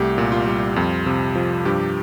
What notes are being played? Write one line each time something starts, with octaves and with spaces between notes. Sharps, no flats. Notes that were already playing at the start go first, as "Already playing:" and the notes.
Already playing: C2 A3 G4
A#2
F4
G3
F2
C3
F3
G2 G4